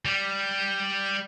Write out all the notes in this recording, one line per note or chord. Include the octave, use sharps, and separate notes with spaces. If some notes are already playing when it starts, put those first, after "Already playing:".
G3